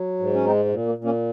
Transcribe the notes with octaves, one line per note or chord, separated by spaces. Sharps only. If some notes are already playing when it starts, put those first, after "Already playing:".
Already playing: F#3
G#2
C#4
G#3 C4 D#4
G#3
A#2
A#3
A#2
A#3 C#4